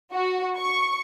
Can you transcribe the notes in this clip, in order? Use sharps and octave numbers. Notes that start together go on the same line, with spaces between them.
F#4
C#6